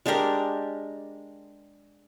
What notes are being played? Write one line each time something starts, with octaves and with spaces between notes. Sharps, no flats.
G#3 D4 G4 A#4